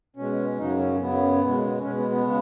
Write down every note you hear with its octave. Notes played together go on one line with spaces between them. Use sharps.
B2 G#3 C#4
F#2 C#3 F#3 D#4
C#4
F#2 C#3 F#3 B3
B2 G#3
B2 G#3 C#4
B3
B3
C#3 G#3